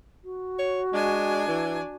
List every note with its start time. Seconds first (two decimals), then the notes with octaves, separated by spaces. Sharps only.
0.24 F#4
0.59 C#5
0.93 G#3 D4 G#5
1.48 E3